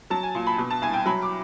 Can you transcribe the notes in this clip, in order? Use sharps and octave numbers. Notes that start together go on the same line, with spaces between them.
F#3 A5
G#5
A#2
B5
B2
A5
C2 G#5
G5
F#3 B5
D6